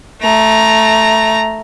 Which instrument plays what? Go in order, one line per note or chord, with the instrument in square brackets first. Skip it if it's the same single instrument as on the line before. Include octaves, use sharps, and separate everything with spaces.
[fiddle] A3 A#5